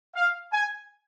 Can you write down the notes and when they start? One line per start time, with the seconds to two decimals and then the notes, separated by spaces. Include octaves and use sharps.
0.15 F5
0.52 G#5